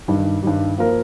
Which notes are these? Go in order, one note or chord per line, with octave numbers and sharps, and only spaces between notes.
G2 D#3 G3
G2 D#3 G3
F3 A#3 F4 A#4